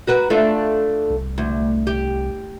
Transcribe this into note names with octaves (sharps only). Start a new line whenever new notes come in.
F#4 A#4 B4
A3 D4 F4
C2
D2
G4